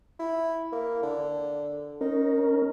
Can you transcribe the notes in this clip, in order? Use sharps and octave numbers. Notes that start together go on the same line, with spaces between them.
E4
A#3
D3
C#4 D#4 A#4